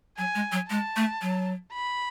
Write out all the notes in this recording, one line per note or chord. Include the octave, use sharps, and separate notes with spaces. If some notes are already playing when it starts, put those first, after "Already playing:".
F#3 G#5
G#3
F#3
G#3 A5
A3
F#3
B5